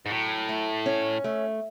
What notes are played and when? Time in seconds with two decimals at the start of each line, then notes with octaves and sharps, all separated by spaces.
0.06 G#2
0.10 A2 F#3
0.49 A3
0.86 C#4
1.24 A3